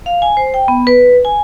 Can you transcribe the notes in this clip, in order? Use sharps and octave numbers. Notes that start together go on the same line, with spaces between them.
F5
G#5
C5
G5
B3
B4
G#5